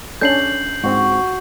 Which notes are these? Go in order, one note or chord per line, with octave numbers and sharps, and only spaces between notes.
C#4 D4 A4 G6 C7 F#7
G#2 C4 F#4